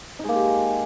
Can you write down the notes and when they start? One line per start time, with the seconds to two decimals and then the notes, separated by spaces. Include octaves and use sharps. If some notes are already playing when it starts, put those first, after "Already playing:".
0.19 D#4
0.24 G#3
0.29 A#3
0.33 G4